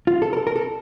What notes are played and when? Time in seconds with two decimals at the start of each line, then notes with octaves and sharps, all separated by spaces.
0.07 F4
0.22 A4
0.33 A#4
0.37 A4
0.47 A#4
0.56 A4